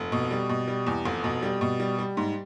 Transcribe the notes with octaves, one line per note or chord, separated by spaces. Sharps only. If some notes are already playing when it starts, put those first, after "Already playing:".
Already playing: F1
B2
G3
B2
G3
E2
F1
B2
G3
B2
G3
G3
G#2